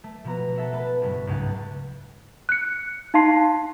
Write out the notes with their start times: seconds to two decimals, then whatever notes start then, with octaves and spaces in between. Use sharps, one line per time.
0.04 A3
0.24 B2 F3 B3 A#5
0.56 A4 E5 F#5
0.72 A3 B4 A5
1.02 F#1 G2
1.27 C#2 G#2 C#3 F#5 F#6 A6
2.49 F#6 C#7
3.14 D#4 F5 A5 C6 C7